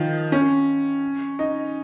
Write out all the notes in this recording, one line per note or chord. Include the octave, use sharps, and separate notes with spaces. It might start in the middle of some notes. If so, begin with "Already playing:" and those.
Already playing: D#3 F3
C#4
D#4